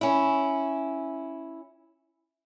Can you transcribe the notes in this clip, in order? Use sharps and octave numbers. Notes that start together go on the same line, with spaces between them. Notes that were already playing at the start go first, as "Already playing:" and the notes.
C#4 E4